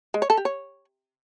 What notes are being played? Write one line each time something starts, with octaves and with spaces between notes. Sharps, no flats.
G#3
C#5
A4
G4
C#5